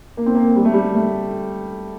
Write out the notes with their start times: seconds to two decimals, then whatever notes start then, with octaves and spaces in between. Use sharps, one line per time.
0.17 A#3
0.26 C4
0.35 A#3
0.56 G3
0.65 A3
0.74 G3
0.95 A3